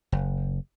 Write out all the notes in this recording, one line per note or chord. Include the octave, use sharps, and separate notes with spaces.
F#1